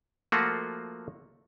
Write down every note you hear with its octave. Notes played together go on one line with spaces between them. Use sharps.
F3 A3 A#3 F4 F#4